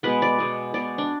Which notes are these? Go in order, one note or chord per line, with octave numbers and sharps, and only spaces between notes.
B2 G#3 B3 B4
D5
B2 G#3 B3
B2 G#3 B3 D5
D4